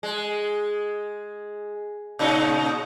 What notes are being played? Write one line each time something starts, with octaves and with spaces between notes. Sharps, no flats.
G#3
A#2 C#3 D#4